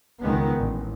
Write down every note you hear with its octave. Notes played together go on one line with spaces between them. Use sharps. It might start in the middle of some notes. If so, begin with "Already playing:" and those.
C#2 D#3 G#3 B3
A1